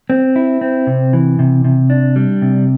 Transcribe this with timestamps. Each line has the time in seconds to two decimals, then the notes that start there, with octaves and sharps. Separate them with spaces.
0.10 C4
0.36 E4
0.61 C4
0.87 C3
1.13 E3
1.39 C3
1.65 C3
1.90 D4
2.16 G3
2.42 C3